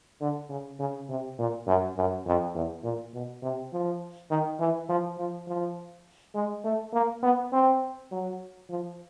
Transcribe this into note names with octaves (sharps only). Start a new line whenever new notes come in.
D3
C#3
C#3
C3
A#2
F#2
F#2
F2
E2
A#2
B2
C3
F3
D#3
E3
F3
F3
F3
G#3
A3
A#3
B3
C4
F#3
F3